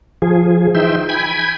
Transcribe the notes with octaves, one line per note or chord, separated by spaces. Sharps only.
F3 G#4
E3 D#4 E5 G5 C6
G5 G#5 B5 G#6